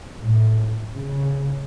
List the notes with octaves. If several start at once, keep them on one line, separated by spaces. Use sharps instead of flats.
A2
C#3